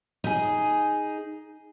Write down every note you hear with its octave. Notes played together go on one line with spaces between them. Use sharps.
D#4 G#4